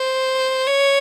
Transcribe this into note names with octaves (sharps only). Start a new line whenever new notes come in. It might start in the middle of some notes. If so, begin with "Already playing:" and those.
Already playing: C5
C#5